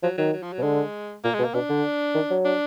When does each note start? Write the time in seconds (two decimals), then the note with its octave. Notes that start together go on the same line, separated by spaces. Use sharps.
0.03 F3 F#3
0.18 D#3 F#3
0.33 F#3
0.43 F3
0.53 F#3
0.59 B2
0.63 D3 G#3
1.24 A#2 A#3
1.35 G#3
1.39 B2
1.44 A#3
1.54 B2 D4
1.70 D3
2.15 D#3
2.30 F#3
2.45 D4